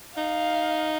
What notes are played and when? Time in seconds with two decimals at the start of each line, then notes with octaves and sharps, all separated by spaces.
0.17 D#4 F5